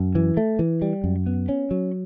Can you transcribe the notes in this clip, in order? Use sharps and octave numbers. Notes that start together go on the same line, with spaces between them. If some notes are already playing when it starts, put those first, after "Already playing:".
Already playing: F#2
E3
A3
E3
G3
F#2
B3
C#4
F#3